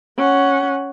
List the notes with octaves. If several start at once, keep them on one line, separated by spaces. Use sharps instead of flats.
C#4 F#5